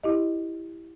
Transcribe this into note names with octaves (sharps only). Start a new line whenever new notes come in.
E4 G4 D#5